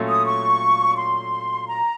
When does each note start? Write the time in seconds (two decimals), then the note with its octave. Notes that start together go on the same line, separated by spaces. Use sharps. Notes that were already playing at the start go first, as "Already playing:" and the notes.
Already playing: A#2 F#3 A3 C#4 F4
0.08 D#6
0.26 C#6
0.96 C6
1.67 A#5